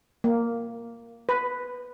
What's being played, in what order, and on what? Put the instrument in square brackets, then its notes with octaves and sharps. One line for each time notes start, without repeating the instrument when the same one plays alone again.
[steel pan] A#3
B4